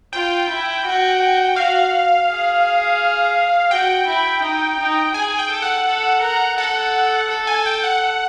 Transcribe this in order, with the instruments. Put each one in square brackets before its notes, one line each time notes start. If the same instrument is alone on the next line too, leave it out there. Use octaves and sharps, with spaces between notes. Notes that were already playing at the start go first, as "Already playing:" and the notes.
[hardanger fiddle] F4 [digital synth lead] G5
[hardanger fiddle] E4
F#4
[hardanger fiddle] F#4 [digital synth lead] F5
[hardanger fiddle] G#4
[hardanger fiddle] F#4 [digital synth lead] G5
[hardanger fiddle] E4
D#4
D#4
[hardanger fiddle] G#4 [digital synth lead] G#5
[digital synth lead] G5
[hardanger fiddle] A4
[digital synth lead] F#5
[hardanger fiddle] A4
A#4
[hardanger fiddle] A4 [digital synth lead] F#5
[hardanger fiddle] A4
[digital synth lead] G#5
G5
F#5